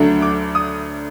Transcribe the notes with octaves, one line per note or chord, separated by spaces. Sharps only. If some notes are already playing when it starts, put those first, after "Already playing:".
Already playing: D2 D3 F#3 A3 D4
D6
D#6